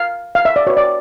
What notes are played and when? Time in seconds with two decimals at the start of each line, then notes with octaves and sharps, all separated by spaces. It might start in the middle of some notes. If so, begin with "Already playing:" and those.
Already playing: F5
0.35 F5
0.45 E5
0.56 D5
0.67 F#4 B4 C#5
0.77 D5